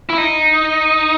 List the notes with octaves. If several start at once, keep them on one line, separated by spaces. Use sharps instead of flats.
E4
D#4